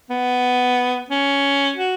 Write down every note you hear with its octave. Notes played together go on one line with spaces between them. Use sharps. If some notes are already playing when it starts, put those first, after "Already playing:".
B3
C#4
F#4